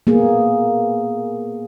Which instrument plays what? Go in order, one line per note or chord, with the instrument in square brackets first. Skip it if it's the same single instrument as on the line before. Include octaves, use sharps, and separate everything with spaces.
[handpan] A#3 B3 G#4